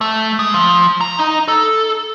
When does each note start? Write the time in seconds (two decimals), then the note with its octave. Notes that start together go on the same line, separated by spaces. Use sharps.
0.01 A3
0.39 G#3
0.54 F3
1.01 A#5
1.19 D#4
1.48 A4